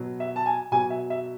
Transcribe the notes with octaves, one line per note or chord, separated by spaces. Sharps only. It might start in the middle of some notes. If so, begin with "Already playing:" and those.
Already playing: B2 F#3
E5
A5
G#5
B2 F#3 G#5
E5
E5